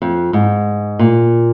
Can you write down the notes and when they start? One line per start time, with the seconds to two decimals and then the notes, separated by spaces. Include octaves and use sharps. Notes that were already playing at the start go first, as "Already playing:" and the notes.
0.02 F2
0.33 G#2
0.99 A#2